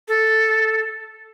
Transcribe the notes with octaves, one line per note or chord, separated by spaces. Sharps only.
A4